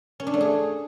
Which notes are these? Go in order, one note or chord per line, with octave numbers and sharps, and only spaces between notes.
C#4
D4
A3
G#4